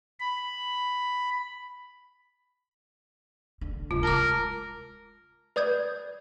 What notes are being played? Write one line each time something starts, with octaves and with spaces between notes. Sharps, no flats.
B5
D3
D1 C2 F4
G#3 A#4 A5 D6
B4 D5 D#6 G6 G#6